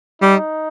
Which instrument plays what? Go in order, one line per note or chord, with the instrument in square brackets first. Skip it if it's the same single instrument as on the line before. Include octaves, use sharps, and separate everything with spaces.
[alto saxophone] G3 [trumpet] D#4